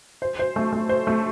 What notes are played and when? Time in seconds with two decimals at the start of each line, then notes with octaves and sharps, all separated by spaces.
0.22 C5
0.39 C5
0.56 A3
0.72 A3
0.89 C5
1.07 A3